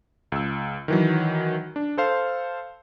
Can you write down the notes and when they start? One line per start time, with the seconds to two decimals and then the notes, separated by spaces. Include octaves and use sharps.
0.32 C#2 E6
0.88 D#3 E3 F#3
1.76 D4
1.98 A4 C5 F5